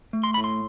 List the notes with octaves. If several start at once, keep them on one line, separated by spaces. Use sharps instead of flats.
A3
C6
A2 B5
C6